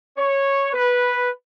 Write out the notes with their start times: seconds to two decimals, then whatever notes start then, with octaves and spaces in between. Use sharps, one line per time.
0.17 C#5
0.72 B4